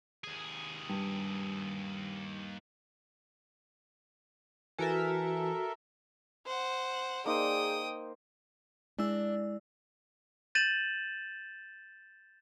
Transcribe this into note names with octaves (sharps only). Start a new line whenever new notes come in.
D#2 G#4
G2
E3 F#4 A4 A#4 E5 G#5
C5 F#5
A#3 D#4 G#4 C5 D5 G5 D#6
G#3 D4 E4 E6
G6 A6 D#7 E7 F#7